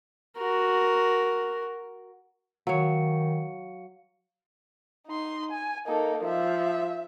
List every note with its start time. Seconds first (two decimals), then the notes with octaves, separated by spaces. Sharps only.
0.37 F#4 A#4
2.67 D#3 F#3 C#5 F5 C#7
5.07 D#4 C6
5.52 G#5
5.87 A#3 D#4 A4
6.25 F3 E5